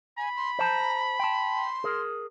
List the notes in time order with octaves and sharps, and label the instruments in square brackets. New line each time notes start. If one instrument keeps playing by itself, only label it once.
[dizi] G#5 [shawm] B5
[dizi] C6
[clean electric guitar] C5 A5 [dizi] A#5
[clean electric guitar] G5 A5 [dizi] C6
[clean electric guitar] G#4 A#4